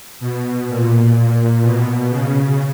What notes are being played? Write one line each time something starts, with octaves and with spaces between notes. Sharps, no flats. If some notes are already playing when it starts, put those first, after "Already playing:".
B2
A#2
B2
C#3